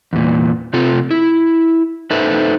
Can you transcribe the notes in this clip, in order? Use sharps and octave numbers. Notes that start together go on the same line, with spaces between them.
E2 A#2
C3 C4 F4 A4
E4
D#4 A4 B4 C5 E5